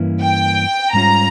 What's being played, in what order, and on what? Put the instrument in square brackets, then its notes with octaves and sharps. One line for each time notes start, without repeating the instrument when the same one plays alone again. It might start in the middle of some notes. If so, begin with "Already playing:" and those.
Already playing: [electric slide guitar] G2 E3 A#3 C#4 E4
[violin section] G5
[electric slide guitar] G#2 G3 C#4 F4 [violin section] A#5